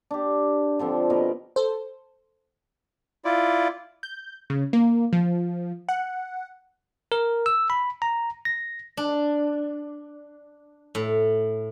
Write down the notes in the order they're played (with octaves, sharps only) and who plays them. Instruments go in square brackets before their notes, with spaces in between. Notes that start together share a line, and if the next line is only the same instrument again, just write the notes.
[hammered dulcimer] D4 G4
D3 F3 C4
B2 A#4 B4 D#5
[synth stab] A4 C5
[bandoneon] E4 F4 D5
[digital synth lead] G6
C#3
A#3
F3
F#5
[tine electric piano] A#4
E6
B5
A#5
A#6
[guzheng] D4
A2